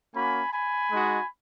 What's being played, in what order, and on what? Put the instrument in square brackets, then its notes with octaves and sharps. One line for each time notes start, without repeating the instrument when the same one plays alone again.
[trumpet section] A#3 C#4 F#4 G#5 B5
G#5 B5
G#3 D#4 F#4